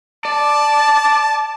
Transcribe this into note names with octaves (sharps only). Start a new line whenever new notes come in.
D5 A5